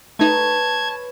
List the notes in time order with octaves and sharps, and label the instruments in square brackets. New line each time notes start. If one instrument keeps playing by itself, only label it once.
[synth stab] A3 D#4 [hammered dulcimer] B4 C#5 [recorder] A5 [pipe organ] G#6